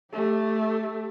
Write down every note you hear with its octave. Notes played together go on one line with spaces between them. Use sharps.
A3 G4